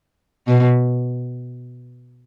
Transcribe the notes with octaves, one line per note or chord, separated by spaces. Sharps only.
B2